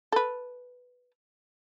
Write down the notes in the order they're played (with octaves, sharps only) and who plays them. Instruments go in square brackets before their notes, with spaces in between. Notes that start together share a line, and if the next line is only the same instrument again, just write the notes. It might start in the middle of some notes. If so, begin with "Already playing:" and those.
[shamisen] A4 B4